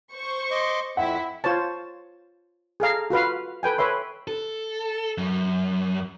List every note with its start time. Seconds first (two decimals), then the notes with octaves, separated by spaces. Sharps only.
0.13 C5 C#6
0.51 D#5 C6 D6
0.97 F2 C4 E4 E5 F#5
1.44 F4 C5 C#5 A5
2.80 G#4 A4 F5 A#5
3.10 F4 F#4 B4 F5
3.63 A4 B4 G5 G#5
3.78 B4 C#5 E5 C6
4.28 A4
5.18 F#2